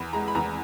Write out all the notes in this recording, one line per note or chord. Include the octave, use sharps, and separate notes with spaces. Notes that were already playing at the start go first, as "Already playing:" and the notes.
Already playing: E2 B5
G#3 A#5
B5
E2 A#5